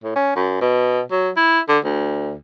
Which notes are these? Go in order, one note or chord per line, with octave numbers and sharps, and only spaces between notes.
A2
C#4
F#2
B2
F#3
E4
D3
D2